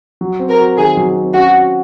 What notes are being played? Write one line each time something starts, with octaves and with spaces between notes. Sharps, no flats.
F#3
C4
A#4
F#4
D#3 G#4
F#3
C4
C#4 F#4
F#4